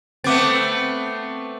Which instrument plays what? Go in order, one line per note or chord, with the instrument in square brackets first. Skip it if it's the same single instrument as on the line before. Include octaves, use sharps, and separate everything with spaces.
[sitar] A3 B3 C4 [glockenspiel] D6 A6